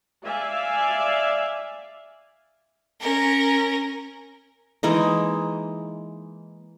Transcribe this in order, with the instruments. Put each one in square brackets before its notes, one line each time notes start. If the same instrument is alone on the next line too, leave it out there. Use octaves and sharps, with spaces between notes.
[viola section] D5 E5 F5 G#5
[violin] C#4 A#4
[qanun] E3 G#3 A#3 D#4